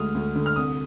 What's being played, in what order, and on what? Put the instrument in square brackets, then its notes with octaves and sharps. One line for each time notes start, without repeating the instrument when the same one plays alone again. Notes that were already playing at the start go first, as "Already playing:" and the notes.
Already playing: [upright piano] D2 G#3 D#6 F6
D2
D3
F6
C2 D#6